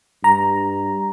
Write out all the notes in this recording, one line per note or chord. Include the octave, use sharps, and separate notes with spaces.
G2 A#5